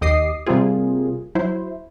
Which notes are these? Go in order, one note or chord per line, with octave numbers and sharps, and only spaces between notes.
D#2 G4 D#5 D6 D#6 C7
C3 G3 A#3 C4 F4 G#4
F#3 E4 C5